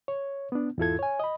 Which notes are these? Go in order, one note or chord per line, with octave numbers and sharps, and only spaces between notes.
C#5
B3 D4
E2 G#2 E4 F4 A4 G#6
C#5 G#5
D#5 B5